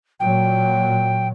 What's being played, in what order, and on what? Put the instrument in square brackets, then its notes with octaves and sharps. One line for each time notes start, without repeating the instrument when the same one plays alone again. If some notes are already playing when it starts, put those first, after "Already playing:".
[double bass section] A#2 F#3 [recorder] G5